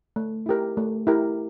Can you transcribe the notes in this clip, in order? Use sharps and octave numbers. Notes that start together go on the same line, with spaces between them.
A3
E4 G4 A#4
A3
E4 G4 A#4